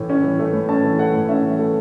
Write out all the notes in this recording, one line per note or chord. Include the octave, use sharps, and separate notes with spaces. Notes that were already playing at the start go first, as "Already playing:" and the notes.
Already playing: A2 E3 A3
C#4
E3
A3
A2
C#4 A5
E3
A3 F#5
A2
C#4 E5
E3
A3